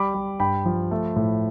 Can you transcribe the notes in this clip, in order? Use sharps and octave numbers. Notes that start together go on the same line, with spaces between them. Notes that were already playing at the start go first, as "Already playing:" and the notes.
Already playing: G3 B5 D6
G3
G2 G5 B5
F3
A3
A2